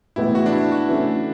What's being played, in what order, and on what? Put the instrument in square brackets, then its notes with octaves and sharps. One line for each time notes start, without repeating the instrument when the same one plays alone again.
[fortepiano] A2 E3 G#3 B3 [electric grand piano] E4
[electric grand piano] F#4
D4
E4
F#4
[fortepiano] E3 A3 C#4